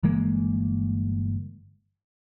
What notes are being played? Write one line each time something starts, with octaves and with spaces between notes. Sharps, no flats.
G1 E3 G#3 A#3